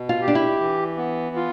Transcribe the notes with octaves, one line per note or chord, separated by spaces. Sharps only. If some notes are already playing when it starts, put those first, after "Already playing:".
Already playing: B2
F4
G4
D4
E4
E3
B3
F4